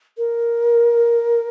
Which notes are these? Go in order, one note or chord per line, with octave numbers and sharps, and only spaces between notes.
A#4